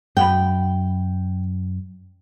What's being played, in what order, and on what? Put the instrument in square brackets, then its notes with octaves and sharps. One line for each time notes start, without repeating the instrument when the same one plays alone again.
[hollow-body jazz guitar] F#2 F#5 B5 [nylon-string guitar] G5